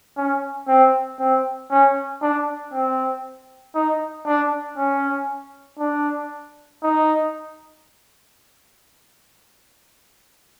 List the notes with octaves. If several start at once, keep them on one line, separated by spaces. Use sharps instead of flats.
C#4
C4
C4
C#4
D4
C4
D#4
D4
C#4
D4
D#4